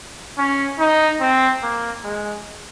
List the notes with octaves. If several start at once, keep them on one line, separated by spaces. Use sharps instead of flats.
C#4
D#4
C4
A#3
G#3